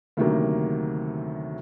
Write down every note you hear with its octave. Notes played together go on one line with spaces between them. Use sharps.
D2 C3 D#3 F#3 A#3